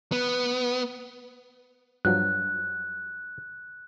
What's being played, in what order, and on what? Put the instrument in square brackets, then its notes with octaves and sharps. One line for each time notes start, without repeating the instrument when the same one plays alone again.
[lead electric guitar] B3
[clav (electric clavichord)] G2 F3 F#3 [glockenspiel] F#6